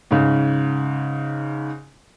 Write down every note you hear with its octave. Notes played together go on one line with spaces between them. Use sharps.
G#2 C#3